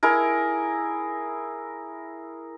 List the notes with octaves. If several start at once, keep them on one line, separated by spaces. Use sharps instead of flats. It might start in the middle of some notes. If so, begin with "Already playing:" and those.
E4 G#4 A#4